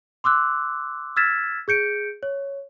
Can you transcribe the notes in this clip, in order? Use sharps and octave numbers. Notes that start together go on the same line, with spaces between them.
C6 D6 E6 F#6
E6 F6 G#6 A6 B6 E7
G#4 G6 C#7 D7
C#5